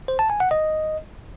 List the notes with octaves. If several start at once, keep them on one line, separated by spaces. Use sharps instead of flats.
C5
A5
G#5
F#5
D#5